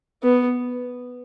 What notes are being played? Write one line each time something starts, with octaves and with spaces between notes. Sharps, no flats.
B3